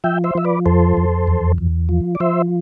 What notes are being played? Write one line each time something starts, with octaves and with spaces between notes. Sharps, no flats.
F3 E5 G5
C5 E5
F3 E5
B4 D5
F2 A4 C5
F2
E2
E2
F3
D5
F3 C5 E5